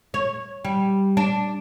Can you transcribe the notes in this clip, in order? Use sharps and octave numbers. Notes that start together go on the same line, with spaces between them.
C#5
G3
D4